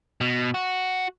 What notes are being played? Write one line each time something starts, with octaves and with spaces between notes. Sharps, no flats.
B2
F#4